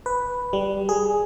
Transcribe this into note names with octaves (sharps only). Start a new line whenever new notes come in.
B4
G3
G#4